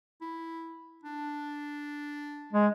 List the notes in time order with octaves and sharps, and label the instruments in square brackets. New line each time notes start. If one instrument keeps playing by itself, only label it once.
[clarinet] E4
D4
[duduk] G#3